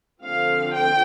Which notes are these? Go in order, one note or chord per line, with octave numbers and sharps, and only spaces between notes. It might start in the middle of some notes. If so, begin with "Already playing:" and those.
D3 F3 C4 F5
G5